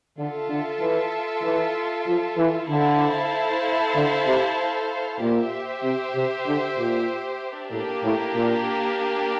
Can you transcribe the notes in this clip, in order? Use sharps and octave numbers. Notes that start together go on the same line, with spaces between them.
D3 F4 A4 E5
D3
E3
E3
F3
E3
D3 E4 A4 C5 F5 A5
D3
C3
A#2 G4 C5 E5
C3
C3
D3
A#2
A2 A#3 D4 G4
A2
A#2